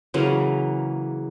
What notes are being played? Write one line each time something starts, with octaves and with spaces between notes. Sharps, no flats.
C#3 E3 F#3 A#3